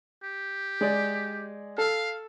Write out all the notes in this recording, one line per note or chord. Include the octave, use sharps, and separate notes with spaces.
G4
G#3 D5
A4 F5